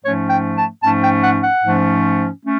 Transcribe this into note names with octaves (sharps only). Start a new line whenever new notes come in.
G#2 F3 A3 C#4 C#5
G5
A5
G#2 F3 A3 C#4 A5
G5
F#5
F#5
G#2 F3 A3 C#4
A3 C#4